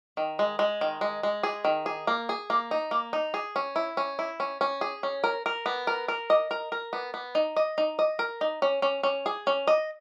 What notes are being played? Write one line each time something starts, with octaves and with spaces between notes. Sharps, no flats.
D#3
G#3
G#3
D#3
G#3
G#3
G#4
D#3
G#4
A#3
G#4
A#3
D#4
A#3
D#4
G#4
C#4
E4
C#4
E4
C#4
C#4
G#4
C#4
A#4
A#4
B3
A#4
A#4
D#5
A#4
A#4
B3
B3
D#4
D#5
D#4
D#5
A#4
D#4
C#4
C#4
C#4
G#4
C#4
D#5